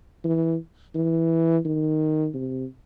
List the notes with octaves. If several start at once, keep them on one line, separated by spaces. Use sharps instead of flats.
E3
E3
D#3
C3